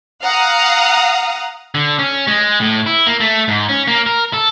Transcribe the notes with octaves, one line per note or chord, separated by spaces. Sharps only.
F5 F#5 A#5 D#6
D3
C#4
G#3
A2
E4
A#3
A3
G#2
C#4
A#3
A#4
A4